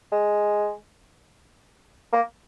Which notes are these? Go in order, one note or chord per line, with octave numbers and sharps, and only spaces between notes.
G#3
A#3